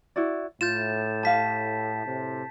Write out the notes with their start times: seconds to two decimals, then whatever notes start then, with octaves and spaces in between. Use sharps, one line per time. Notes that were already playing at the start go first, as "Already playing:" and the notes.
0.16 E4 F#4 D5
0.61 A2 F4 G6 A6 E7
1.23 G4 F5 A5 B6
2.05 A2 C3